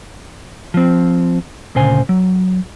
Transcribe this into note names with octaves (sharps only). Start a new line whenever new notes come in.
F3 C4
D2 A#2 C#3 C5 G#5
F#3